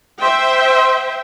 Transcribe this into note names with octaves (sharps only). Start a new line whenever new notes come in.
C5 E5 G5 C6